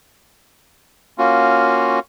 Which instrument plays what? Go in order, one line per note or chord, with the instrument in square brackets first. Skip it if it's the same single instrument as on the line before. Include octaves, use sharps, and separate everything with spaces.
[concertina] A#3 C#4 F4 F#4